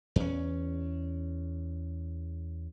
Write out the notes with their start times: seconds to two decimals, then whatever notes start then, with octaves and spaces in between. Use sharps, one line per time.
0.16 E2 C#4